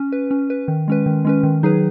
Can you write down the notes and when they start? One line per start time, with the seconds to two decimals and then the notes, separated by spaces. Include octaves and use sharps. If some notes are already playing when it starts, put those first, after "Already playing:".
Already playing: C#4
0.12 B4
0.31 C#4
0.50 B4
0.68 D#3
0.88 G#3 C#4 B4
1.06 D#3
1.25 G#3 C#4 B4
1.43 D#3
1.63 F#3 D#4 G#4 B4